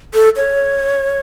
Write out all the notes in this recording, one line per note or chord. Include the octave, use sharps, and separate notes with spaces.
A4
C#5